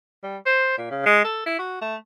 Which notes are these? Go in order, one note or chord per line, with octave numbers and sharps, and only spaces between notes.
G3
C5
A#2
C#3
G#3
A4
E4
F#4
A3